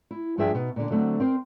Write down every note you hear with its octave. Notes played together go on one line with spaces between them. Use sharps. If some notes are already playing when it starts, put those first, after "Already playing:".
E4
G2 F3 D4 G#4 E5 G5
B2 D#4
A#2 D3
D3 F#3 A3 C4
C4 A#4 C5